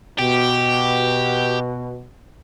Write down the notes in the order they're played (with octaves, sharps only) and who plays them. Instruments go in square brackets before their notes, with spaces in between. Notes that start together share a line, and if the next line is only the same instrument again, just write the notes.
[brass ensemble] B2 [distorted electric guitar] G4